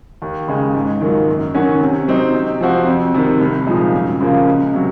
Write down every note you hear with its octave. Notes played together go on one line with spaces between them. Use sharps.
D#2
C#3 G#3
G#2
D#3 F#3 A#3 F4
F#2
D#3 F#3 C#4 F#4
C3
F#3 C4 D#4
C3
F3 C4 F#4
F2
C3 D#3
C2
A#2 F3 G#3 D#4
F#2
C#3 F3 A#3 F4
C#2
C3 F#3